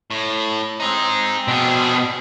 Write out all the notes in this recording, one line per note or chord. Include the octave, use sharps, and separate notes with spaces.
A2
C4 D#4 G#4
B2 D4 G#4